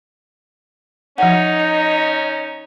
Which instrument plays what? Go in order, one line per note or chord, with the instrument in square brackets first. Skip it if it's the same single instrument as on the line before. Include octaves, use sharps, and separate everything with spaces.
[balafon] F3 F#5 [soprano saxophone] C#4 [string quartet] D#4